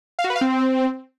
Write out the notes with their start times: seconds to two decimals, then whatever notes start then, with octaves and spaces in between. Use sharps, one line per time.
0.19 F5
0.24 F#4
0.30 B4
0.36 F5
0.41 C4